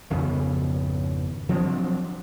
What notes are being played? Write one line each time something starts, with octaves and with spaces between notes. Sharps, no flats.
G#1 F2 C#3 B3
F3 F#3 C4 D4